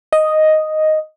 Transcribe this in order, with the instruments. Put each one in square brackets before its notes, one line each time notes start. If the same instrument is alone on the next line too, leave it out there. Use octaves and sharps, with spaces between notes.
[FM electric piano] D#5